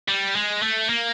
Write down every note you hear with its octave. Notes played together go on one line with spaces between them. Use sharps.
G3
G#3
A3
A#3